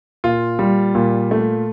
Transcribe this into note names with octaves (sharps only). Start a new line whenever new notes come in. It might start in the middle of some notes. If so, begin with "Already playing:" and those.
A#2 F4
G3
A#2
A3